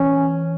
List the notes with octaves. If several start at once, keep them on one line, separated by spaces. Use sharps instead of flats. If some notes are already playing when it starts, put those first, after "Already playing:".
Already playing: E3 C#4